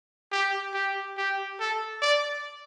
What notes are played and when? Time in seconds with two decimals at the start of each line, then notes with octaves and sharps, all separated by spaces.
0.32 G4
0.74 G4
1.17 G4
1.60 A4
2.02 D5